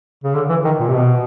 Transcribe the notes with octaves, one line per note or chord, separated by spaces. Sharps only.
C#3
D3
E3
D#3
A#2
C3
B2